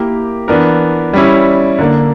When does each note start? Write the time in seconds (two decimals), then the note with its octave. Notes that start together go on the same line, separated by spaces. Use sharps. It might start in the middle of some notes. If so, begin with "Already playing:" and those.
Already playing: A#3 E4 G4 A#4
0.48 E3 B3 D4 A#4
1.13 G3 C#4 E4
1.79 D3 A#3 D4